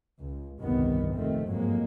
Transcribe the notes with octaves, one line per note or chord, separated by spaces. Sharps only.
C#2
G1 C2 F2 D#3 G3 B3
F1 A#1 D#3 A3 C4
G1 F2 G#2 F#3 G#3 A#3